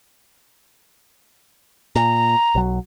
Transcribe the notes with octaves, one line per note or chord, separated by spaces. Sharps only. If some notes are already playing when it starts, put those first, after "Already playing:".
A#2 A#5
B1 F#3